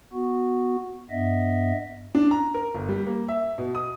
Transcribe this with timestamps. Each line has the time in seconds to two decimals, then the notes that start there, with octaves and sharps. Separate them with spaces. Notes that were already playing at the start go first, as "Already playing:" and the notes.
0.13 B3 F#4
1.10 G2 B3 D#5 E5
2.15 D4
2.31 A#5
2.54 A#4
2.74 G1
2.89 G3
3.07 A#3
3.28 E5
3.58 B2
3.75 D#6